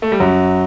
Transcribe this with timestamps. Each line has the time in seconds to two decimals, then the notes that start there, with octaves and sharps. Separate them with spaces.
0.02 A3
0.12 G3
0.20 F#2 F#3